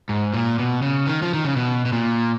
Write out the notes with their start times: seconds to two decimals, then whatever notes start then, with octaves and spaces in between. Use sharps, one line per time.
0.09 G#2
0.34 A#2
0.59 B2
0.82 C#3
1.07 D#3
1.22 F3
1.34 D#3
1.45 C#3
1.56 B2
1.86 B2
1.93 A#2